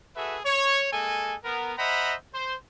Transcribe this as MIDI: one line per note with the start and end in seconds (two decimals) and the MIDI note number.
0.16 0.39 66
0.16 0.39 68
0.16 0.39 69
0.16 0.39 71
0.16 0.39 76
0.45 0.91 73
0.92 1.36 56
0.92 1.36 58
0.92 1.36 69
0.92 1.36 80
1.44 1.72 59
1.44 1.72 70
1.78 2.14 72
1.78 2.14 75
1.78 2.14 76
1.78 2.14 78
1.78 2.14 82
1.78 2.14 83
2.34 2.55 72